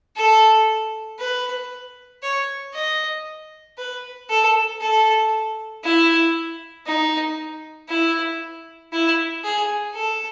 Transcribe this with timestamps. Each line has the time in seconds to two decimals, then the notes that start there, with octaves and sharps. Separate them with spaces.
0.17 A4
1.19 B4
2.23 C#5
2.74 D#5
3.78 B4
4.29 A4
4.81 A4
5.84 E4
6.87 D#4
7.89 E4
8.93 E4
9.44 G#4
9.95 A4